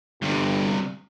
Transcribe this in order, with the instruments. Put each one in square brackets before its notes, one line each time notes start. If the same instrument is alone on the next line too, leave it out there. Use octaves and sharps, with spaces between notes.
[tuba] G1 [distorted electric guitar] G2 C3